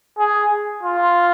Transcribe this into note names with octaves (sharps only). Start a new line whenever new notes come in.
G#4
F4